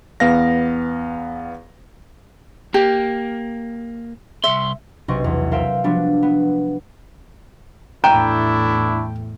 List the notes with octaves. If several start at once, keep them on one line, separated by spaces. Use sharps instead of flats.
E2 B3 F5 A#6
A#3 G4
C2 F2 E5 C6
B1 C3 C4 D#5 C#6
E2
A#4 C5 E5 F5 G5
F3 G3 B3 D4 F#4
B3
E2 A2 A3 D4 E4 G5 A#5